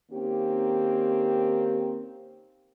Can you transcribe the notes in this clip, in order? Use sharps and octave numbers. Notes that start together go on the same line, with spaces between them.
D#3 A#3 C4 C#4 G4